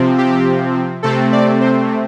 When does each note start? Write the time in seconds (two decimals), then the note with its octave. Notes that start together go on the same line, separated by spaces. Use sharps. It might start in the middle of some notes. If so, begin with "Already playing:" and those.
Already playing: C3 F3 C4
0.18 G4
1.03 C3 A3 C4 A4
1.32 D5
1.61 C5